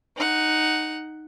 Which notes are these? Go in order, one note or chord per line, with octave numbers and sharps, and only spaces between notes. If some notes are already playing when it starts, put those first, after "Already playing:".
D#4 F#5